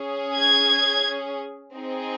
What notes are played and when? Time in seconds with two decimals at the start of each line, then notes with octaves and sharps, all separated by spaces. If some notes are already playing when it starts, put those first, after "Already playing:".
Already playing: C#4 G#4
0.36 G#6
1.74 C4 D#4 G#4